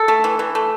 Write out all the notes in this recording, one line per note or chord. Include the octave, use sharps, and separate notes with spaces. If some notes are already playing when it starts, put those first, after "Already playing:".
Already playing: A4
A3
E3
E3
A3